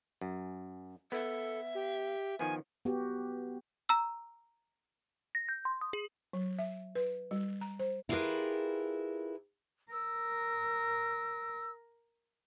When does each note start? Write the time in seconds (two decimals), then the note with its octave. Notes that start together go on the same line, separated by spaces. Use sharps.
0.21 F#2
1.12 B3 A4 E5
1.75 G4
2.39 D#3 F3 B3 G#5
2.85 B3 F#4 G4
3.89 A#5 E6
5.35 A#6
5.49 G6
5.65 C6
5.81 D#6
5.93 G#4
6.33 F#3
6.59 E5
6.95 B4
7.31 G3
7.61 A#5
7.79 C5
8.09 E4 F4 G4 G#4 A#4 B4
9.92 A#4 E6